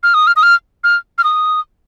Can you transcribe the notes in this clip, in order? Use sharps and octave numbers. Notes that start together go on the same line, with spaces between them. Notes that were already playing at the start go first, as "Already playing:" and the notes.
F6
D#6
F6
D#6
F6
F6
F6
D#6